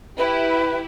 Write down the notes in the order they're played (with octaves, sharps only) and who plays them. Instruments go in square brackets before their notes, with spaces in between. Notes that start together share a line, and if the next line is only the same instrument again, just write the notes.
[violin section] E4 G4 [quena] B4